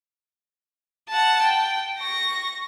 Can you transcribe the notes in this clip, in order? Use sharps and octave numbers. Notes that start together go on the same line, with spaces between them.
F#5 A5
G5
C#6 A#6